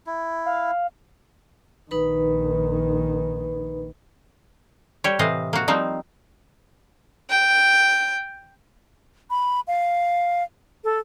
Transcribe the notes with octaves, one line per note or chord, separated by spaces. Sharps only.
E4
F5
A#1 D#3 D#4 B4 B5
G3 G4 C#5
A2 C3 E3 C4 D#5 F5
A#3 F#4
F3 G3 A#3 C4 D#4
G5
B5
F5
A4